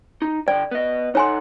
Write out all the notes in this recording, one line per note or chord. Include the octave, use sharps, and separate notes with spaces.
D#4
D3 D5 G5
B3 D#5
D#4 A4 C#5 F#5 G#5 C6